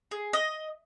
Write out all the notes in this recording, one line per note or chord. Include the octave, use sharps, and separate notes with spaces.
G#4
D#5